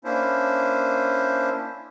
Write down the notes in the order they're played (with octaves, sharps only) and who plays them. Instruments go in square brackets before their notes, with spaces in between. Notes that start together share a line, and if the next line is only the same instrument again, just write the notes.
[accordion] A#3 C#4 D4 E4 C5